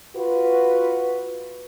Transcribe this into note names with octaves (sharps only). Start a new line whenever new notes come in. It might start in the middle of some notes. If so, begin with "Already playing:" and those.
F4 F#4 B4